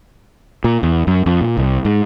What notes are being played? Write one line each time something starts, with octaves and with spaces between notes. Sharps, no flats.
A#2
E2
F#2
F2
A#2
C2
G#2